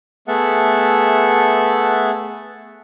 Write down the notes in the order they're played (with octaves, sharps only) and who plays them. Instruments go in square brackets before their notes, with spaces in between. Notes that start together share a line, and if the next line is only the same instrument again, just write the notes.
[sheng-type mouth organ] A3 B3 G#4 E5 F#5 A5